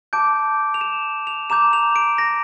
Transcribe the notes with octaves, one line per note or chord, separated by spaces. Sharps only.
A5 D6 G6 D7
F7
E7
F7
A#5 D6 G6 E7
F7
D7
A#6